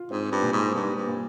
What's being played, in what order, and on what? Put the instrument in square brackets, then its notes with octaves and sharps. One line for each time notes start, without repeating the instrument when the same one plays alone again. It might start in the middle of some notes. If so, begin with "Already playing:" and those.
Already playing: [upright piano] F4
[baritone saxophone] G#2 [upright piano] C4
[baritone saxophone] G2
[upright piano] A#2
[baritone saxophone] G#2
[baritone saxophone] G2 [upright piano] A#2
[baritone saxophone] G2
[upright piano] A#2